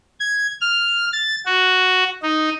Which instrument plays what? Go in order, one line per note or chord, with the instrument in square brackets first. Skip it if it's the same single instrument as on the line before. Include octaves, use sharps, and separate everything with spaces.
[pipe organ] G#6
F6
A6
F#4
D#4